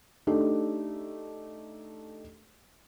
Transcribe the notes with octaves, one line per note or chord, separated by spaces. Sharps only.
A3 D4 D#4 G4